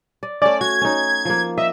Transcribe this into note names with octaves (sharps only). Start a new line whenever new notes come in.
D5
A3 C#4 D5
F#4 G#6
C#4 D#4
F3 A#3
D#5 E5